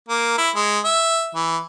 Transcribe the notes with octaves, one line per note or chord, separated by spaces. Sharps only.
A#3
E4
G#3
E5
E3